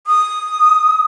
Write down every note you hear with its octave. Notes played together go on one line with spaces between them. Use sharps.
D#6